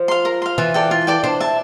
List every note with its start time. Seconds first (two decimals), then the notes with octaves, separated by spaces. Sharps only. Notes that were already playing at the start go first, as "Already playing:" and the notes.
Already playing: F3
0.08 F5 C6
0.25 A#4
0.42 F5 C6
0.58 E3 F4
0.74 A4 D5 G5
0.91 F4
1.07 A4 D5 G5
1.24 D4 C5
1.41 E5 A5